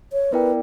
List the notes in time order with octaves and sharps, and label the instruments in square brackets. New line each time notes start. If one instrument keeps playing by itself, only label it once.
[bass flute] C#5
[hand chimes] B3 E4 A#4 D5 G5 [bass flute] B4